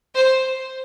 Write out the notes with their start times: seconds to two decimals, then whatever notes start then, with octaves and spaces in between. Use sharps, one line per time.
0.15 C5